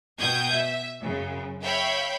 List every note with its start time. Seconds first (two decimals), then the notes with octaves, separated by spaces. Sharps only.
0.19 B2 G5 D#6 G6 G#6
0.51 E5
1.02 F#2 C#3
1.63 C#5 E5 F5 G5 B5 G6